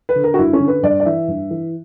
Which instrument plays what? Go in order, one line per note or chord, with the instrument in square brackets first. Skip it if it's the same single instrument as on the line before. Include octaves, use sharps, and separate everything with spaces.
[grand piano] B4
D3
A#4
F#4
G2 E4
C#4
D3
B4
G2 D5
D5
E3 E5
G2
E3